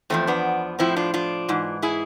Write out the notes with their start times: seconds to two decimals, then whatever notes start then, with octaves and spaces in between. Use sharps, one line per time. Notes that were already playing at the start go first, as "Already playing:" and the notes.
0.10 E2 D3 F3 A3 C4
0.27 B3 D4
0.79 A2 F3 C4 E4
0.96 D4 F4
1.14 D4 F4
1.49 G#2 E3
1.82 E4 G#4